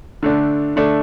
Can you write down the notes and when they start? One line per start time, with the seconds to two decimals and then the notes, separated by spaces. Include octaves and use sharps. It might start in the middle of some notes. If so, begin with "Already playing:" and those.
0.23 D3 A3 D4
0.76 D3 A3 D4